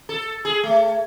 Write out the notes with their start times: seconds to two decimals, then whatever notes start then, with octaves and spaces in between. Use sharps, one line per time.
0.09 A4
0.45 G#4
0.63 A3